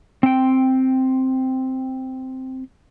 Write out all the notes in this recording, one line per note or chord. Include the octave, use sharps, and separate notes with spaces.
C4 G5